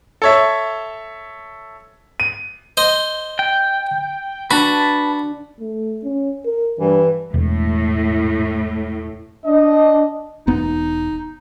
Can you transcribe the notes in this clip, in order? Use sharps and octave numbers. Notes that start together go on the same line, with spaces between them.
A4 C#5 E5
D#7
C5 D#5
G5
D4 F#4 B4 A5
A3
C#4
A#4
G2 E3
E1 A2
D4 D#5
E1 B3 D#4